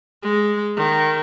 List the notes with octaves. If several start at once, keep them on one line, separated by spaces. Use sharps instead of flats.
G#3
D#3